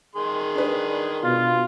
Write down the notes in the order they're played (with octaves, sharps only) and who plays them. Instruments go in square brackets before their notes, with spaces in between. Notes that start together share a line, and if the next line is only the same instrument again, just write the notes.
[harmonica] D#3 G#4 C6
[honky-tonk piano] D4 B4
[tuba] B2 [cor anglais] F4